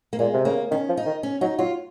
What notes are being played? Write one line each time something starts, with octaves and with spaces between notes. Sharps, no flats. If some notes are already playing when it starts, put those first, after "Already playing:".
A#3
A#2 G#3
C3
C#3 A#3
D#3 C#4
F3
D#4
D#3
C#4
F#3 D#4
F#3 F4